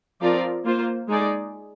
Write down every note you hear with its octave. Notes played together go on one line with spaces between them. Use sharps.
F3 C4 F4 A#4 D5
A#3 F4 C5
G#3 D#4 G#4 D5